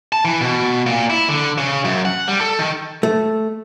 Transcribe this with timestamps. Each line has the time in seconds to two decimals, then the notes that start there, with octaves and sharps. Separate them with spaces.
0.13 A5
0.25 E3
0.41 B2
0.86 A#2
1.10 E4
1.29 D3
1.58 C#3
1.85 F#2
2.05 F#5
2.28 G3
2.41 A4
2.59 D#3
3.03 A3